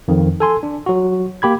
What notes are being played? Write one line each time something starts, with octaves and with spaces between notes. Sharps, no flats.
F2 D#3
A4 G#5 C6
D4
F#3 F#4
A#3 G4 B5 G#6